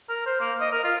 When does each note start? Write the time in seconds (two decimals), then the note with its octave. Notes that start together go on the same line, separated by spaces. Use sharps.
0.09 A#4
0.26 C5
0.40 A#3
0.60 D#5
0.72 A#4
0.84 F4